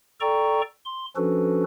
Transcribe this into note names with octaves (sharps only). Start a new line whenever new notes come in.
A4 D5 G5 A#5 C#6
C6
F3 C#4 D4 F#4 A4 B4